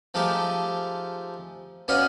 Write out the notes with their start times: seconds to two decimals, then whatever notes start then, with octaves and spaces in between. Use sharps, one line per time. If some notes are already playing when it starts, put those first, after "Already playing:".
0.14 F3 G#3 A3 D#4 G4
1.88 B3 C#4 D#4 F#4 D5 F5